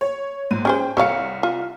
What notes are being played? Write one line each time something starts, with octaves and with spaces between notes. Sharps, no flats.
C#5
A#1 G#2 D#7
C#4 G#4 C5 G5
C2 A4 C#5 F5 C#7
F4